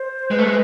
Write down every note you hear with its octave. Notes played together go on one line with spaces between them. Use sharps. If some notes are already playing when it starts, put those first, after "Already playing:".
Already playing: C5
G#3 B4
A3
G#3